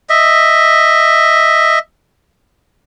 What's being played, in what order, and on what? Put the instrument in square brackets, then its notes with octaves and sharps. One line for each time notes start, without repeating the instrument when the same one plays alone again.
[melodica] D#5 E5